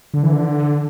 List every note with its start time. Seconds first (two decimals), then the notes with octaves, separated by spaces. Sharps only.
0.14 D3
0.23 E3
0.33 D3